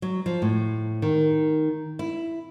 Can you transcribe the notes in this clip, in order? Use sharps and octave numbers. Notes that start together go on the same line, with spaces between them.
F#3
F3
A2
D#3
E4